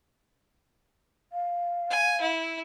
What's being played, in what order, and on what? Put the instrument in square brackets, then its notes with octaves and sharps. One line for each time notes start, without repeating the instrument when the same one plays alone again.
[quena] F5
[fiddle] G#5
E4